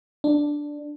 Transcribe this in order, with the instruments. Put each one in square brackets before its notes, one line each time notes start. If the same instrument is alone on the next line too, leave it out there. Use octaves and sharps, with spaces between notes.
[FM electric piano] D4